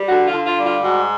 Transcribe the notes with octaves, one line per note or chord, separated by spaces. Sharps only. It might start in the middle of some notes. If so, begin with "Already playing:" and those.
Already playing: G3
D3 F#4
F4
D3
F4
G3
F4
G#2 F#4